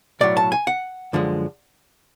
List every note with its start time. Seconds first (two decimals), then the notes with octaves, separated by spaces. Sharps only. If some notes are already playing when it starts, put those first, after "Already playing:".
0.21 B1 A2 F#3 D5
0.37 A5
0.52 G#5
0.67 F#5
1.13 F#2 D3 F3 G#3